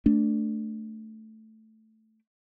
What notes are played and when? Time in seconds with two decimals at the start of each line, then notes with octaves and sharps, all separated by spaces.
0.06 A3 D4